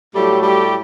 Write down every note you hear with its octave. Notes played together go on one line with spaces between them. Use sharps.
A2 F#3 G3 A3 G4
G3 G4